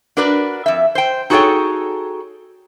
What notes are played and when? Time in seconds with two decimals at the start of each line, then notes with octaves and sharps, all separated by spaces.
0.17 D4 F#4 A#4 B4 D5
0.66 F2 E5
0.95 C5 G5
1.30 D#4 F#4 G#4 A4 C#5 G5